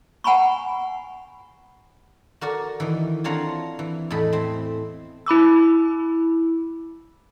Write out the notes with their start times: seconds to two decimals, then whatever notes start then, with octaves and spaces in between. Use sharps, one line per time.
0.24 F#5 G#5 A#5 B5 C#6
2.41 F#4 A#4 D5 F#5
2.80 D#3 E3
3.24 C4 D4 F4 C#5 F#5 A#5
3.79 E3
4.10 E2 A2 A3 D#5 B5
4.33 C4
5.26 E4 B5 D6 E6